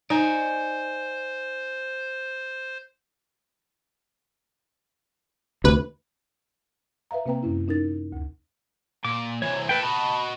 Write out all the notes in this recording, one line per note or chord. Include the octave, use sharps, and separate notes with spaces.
D#4 C5 D5 G#5
D2 C3 B4
B4 E5 F5 A#5
C3 A#3 C4 B4 G5 A#5
F#2 C#4 E4
C#4 D#4 A#4 A6
D2
A#2 D6
C3 E3 C#5
E4 A4 B4 G5
F#4 D#5 A5 B5